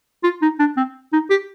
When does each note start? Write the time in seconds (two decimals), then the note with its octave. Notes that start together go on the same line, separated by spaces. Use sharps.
0.24 F4
0.42 D#4
0.59 D4
0.77 C4
1.13 D#4
1.30 G4